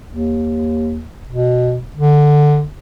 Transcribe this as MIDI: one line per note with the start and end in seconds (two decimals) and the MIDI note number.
0.09 1.07 39
1.29 1.80 47
1.96 2.64 50